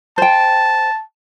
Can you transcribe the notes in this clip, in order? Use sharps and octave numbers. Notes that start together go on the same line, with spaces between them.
C5 G5 A5